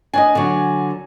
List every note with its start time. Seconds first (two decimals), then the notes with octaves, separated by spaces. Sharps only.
0.14 D4 D5 D#5 G#5
0.35 D3 F#3